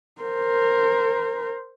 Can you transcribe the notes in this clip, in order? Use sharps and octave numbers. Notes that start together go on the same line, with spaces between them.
A#4 C5